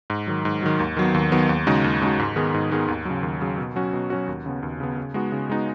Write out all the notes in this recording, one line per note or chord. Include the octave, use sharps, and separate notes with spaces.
G#2
D#3 F#3
G#2
D#3 F#3
D#2
D#3 F#3 B3
D#2
D#3 F#3 B3
D#2
C#3 G#3 D#4 F#4
D#2
C#3 G#3 D#4 F#4
G#2
D#3 B3 G#4
G#2
D#3 B3 G#4
D#2
C#3 F#3
D#2
C#3 F#3
B2
F#3 C#4 F#4
B2
F#3 C#4 F#4
D#2
C#3 B3
D#2
C#3 B3
C#3
G#3 B3 D#4 F#4
C#3
G#3 B3 D#4 F#4